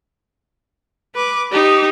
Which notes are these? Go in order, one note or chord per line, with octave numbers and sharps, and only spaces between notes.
B4 D6
D#4 G4